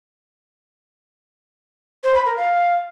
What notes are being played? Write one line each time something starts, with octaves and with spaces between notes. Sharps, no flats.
C5
B5
A#4
F5